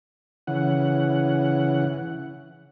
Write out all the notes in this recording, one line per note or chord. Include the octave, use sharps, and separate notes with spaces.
C#3 E3 F#5